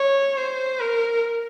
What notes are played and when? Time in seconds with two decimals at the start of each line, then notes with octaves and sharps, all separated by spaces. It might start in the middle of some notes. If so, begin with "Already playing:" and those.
Already playing: C#5
0.37 C5
0.80 A#4